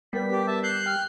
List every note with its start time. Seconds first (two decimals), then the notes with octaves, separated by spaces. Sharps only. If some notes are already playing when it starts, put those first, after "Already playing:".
0.13 G3 B3 A#4 B4 B6
0.32 D4 G4
0.47 E5 A5
0.63 F#6 G6 C7
0.86 G5 F6